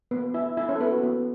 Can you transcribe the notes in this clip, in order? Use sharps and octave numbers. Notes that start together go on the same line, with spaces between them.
B3 B4
E4 E5
E4 E5
C#4 C#5
A4
B3 B4
F#4
B3